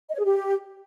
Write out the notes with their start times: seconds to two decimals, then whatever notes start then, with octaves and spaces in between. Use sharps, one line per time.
0.09 D#5
0.14 C#5
0.19 G#4
0.24 G4